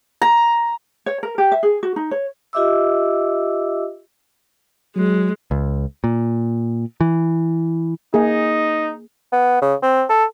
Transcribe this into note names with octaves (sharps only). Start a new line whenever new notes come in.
A#5
C#5
A#4
G4
E5
G#4
F#4
D#4
C#5
F4 G4 D#5 E5 D6 E6
F#3 G#3
C#2
A#2
E3
A#3 D#4 G#4
B3
C#3
C4
A4